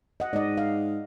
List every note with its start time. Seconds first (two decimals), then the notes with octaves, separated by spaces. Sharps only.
0.20 D#5 F#5
0.33 G#2 D5 D#5
0.58 F5